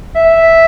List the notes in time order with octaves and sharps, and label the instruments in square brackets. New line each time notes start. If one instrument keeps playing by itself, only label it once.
[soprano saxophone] E5